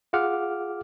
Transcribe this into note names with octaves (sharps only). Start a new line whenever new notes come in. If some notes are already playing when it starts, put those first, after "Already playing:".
F4 G#4 F5 F#5 D6 F6